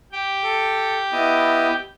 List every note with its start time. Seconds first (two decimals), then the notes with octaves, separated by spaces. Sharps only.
0.12 G4 G5
0.43 A4
1.12 B3 E4 D#5